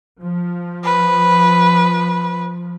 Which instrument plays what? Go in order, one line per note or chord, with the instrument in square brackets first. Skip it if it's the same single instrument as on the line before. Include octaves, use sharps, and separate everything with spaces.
[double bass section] F3
[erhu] B4